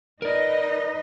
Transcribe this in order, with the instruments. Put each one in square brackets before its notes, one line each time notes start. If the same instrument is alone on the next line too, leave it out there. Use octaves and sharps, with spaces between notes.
[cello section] D#4 B4 D#5 [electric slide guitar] A#4 D5